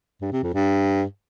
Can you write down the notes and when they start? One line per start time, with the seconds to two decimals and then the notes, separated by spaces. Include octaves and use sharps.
0.22 G2
0.33 C3
0.43 F2
0.54 G2